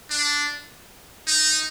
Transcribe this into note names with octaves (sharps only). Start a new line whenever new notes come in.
D4
D#4